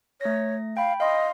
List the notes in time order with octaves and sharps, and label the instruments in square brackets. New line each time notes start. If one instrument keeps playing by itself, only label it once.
[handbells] A3 A#6 [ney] C#5
[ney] F5 [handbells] G5 B5
[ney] D#5 [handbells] F5 C6